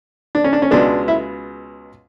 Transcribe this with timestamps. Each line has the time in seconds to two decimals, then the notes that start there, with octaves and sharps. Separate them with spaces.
0.35 D4
0.44 C#4
0.53 D4
0.62 C#4
0.71 C#2 B2 G#3 B3 D4
1.08 E4